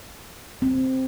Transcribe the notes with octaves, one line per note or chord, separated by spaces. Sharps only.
C4